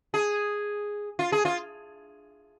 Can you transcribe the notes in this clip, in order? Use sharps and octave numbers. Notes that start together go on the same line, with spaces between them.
G#4
F4
G#4
F4